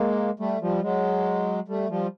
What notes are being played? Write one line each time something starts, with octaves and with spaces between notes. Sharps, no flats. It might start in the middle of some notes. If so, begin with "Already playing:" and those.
Already playing: G#3 A#3
G3 A3
F3 G3
F#3 G#3
G3 A3
F3 G3